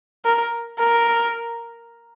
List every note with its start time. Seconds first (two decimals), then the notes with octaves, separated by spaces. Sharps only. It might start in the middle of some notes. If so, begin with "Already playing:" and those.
0.25 A#4
0.79 A#4